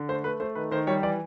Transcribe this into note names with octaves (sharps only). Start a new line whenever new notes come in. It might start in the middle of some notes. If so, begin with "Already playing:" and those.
Already playing: D3
A3 C5
A3 B4
A3 C5
D#3 B4
D#3 C5
G3 C#5
E3 D5